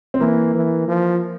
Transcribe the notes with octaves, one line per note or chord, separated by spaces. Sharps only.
C4
E3 A#3
E3
F3